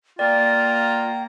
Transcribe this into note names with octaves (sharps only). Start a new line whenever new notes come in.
A#3 F4 D5 G5 A#5